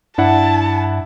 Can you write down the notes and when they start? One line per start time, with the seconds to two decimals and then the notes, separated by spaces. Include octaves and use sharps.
0.18 G2 D4 E4 F#5 A5